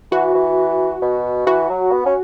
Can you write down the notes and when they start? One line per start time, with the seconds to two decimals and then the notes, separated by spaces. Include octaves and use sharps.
0.11 E3 F#4
0.35 E3
1.02 B2
1.46 E3 F#4
1.69 F#3
1.92 B3
2.06 C#4